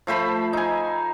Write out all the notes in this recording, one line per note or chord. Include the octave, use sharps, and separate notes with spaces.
F3 A3 C5 B5
D#4 G#5